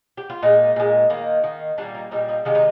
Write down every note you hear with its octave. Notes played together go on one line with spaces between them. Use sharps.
G4
F4
A#2 G#3 D#4
A#2 G#3
D#3 A#3
D#3 A#3
A#2 G3 A#3 D4
D#4
A#2 G3 A#3 D#4
D#4
C3 D#3 G#3 F4
D#4